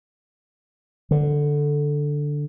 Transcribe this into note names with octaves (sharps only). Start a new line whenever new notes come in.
D3